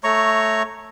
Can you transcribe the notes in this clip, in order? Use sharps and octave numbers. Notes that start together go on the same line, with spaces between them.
A3 C#5 A#5 C#6